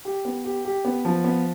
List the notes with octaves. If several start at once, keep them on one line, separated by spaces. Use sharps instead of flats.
G4
B3
G4
G4
B3
F3
B3